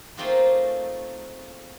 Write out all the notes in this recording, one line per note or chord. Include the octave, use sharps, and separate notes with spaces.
A3 A#3 C4 D#4 F4 G#4